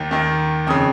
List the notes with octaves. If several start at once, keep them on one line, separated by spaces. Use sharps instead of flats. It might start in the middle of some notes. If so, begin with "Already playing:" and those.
Already playing: D#2 D#3
D#2 D#3
F2 C#3 D#6